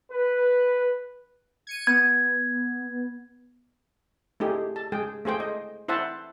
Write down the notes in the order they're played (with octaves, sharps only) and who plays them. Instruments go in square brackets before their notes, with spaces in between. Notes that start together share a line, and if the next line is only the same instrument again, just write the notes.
[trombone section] B4
[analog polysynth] G#6 C#7 D#7
[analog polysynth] B3 [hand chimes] G#6
[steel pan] A3 D#4 G4 G#4
A5
G#3 G#4 G5
A3 G#4 C5 G5
D#5
E4 C5 E5 F#5 A5